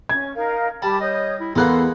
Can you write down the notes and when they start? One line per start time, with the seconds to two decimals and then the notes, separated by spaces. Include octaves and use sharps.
0.09 C#4 G#6
0.35 D#4 A#4 F5
0.82 G3 G4 A5 B5
1.01 C#5 D#5 D#6 G6
1.40 E4
1.56 E2 G#3 A#3 B3 A4 B5 C6 F#6